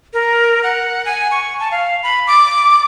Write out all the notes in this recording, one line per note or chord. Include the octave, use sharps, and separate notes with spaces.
A#4
F#5
G#5
C#6
A5
F5
B5
D6